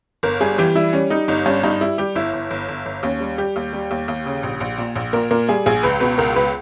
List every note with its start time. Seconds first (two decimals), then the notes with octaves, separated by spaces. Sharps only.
0.23 G1 A#4
0.41 G3 G#4
0.58 E3 G4
0.75 G3 E4
0.93 G3 C#4
1.10 G3 D#4
1.28 G1 D#4
1.46 G2 C#4
1.63 G2 D#4
1.81 G3 E4
1.98 G3 G4
2.15 G1 E4
2.33 G1
2.51 G1
2.68 G1
2.86 G1
3.03 D#2 C#4
3.20 G3
3.38 G3 G4
3.56 D#2
3.73 G3
3.91 D#2
4.08 D#2
4.26 C#3
4.43 A#1
4.60 A#1
4.78 A#2
4.96 A#1
5.13 A#2 A#4
5.31 A#2 A#4
5.48 G3 G#4
5.66 A#1 G#4
5.83 C#2 B4
6.00 B2 B4
6.18 C#2 A#4
6.36 C#2 B4